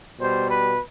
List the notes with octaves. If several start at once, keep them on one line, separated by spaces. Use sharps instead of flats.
B2 G3 C5
B4